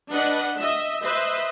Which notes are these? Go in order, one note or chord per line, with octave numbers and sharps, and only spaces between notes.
D4 B4 D#5 F#5
D#5 E5
B4 C5 D#5 E5